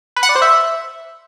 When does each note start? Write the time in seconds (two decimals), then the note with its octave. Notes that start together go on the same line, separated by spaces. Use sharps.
0.16 B4
0.23 F#5
0.29 D5
0.35 C5
0.42 E5